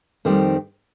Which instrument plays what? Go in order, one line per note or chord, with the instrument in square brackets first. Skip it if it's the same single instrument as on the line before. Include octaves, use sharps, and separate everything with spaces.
[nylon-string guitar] F2 D#3 G3 C4 G4